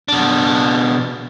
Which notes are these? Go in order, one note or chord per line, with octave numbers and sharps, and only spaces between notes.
B2 D4